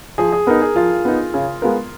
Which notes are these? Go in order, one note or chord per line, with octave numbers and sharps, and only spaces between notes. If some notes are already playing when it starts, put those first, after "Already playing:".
F3 G#4
G#4
B3 D#4 A#4
G#4
F3 F4
B3 D#4
C#3
G#3 B3 F4 A#4